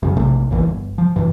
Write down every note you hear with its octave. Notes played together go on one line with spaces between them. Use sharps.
F#2 C#3
A#1 C3 A3
A#1 D#2 D3 E3
G1
F3
G2 E3